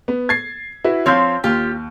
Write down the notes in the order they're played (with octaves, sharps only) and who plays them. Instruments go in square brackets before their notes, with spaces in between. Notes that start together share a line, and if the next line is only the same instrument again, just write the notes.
[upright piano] B3
G#6 A6 C7
E4 F#4 B4
[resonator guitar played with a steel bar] F3 C4 [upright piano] C#5 F5 G6
[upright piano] D#2 [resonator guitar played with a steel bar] F4 G4